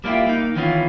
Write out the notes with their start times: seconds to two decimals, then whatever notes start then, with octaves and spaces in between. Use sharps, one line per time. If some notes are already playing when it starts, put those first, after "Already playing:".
0.04 G3 A#3 C#4 E4 F4 G4
0.27 A#3 D#4
0.56 D#3 E3 B3 C#4 D#4 F4